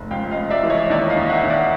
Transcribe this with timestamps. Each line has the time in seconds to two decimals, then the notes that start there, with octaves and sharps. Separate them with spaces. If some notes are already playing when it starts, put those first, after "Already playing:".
Already playing: F1
0.11 C#2 F5 G5
0.31 D#5 F5
0.37 C#2
0.50 D5 E5
0.63 E3
0.70 C#5 D#5
0.90 D#2 D5 E5
1.10 D#5 F5
1.17 D#2
1.30 E5 F#5
1.43 D#2
1.49 D5 E5